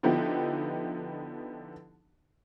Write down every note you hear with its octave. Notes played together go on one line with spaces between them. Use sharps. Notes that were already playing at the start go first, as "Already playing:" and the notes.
D3 F3 B3 D#4 E4 G4